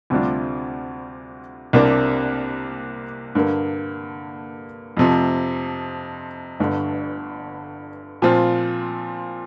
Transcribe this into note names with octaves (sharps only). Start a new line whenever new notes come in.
D2 C3 G3 D4 F4
C2 C3 A#3 D4
G2 D3 A#3
F2 C3 F3
G1 G2 D3
A#2 F3 C4 F4